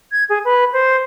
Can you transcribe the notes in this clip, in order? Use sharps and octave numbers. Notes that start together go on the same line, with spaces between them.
G#6
G#4
B4
C5